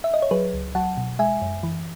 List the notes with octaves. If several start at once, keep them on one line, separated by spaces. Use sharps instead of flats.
E5
D#5
C#5
F#3 G#4 B4
C#2
F#3 F#5 A5
B2
G#3 E5 G#5
F#2
E3